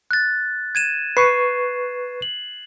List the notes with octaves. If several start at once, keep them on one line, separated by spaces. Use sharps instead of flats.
F#6 A6
G#6 D#7 E7
B4 C#6 C7
F#7